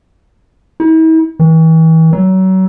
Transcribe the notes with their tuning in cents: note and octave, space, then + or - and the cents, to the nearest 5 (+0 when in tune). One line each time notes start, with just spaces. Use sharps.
E4 -45
E3 -35
F#3 +30